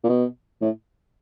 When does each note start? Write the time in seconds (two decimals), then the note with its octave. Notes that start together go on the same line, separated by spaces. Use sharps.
0.04 A#2
0.09 B2
0.62 A2